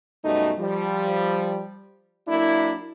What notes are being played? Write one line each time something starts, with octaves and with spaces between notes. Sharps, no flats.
F#2 B2 G3 A3 D#4
F3 G3
F#3 A#3 D4 E4